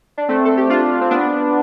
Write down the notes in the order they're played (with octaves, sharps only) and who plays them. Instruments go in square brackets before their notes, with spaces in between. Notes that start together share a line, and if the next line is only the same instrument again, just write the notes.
[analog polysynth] D4
A3 C4
A4
G4
D4 F4
C4
B3 D4